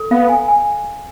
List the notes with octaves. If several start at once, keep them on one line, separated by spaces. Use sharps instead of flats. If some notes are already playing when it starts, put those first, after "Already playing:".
Already playing: A4
B3 F5
G#5
G#5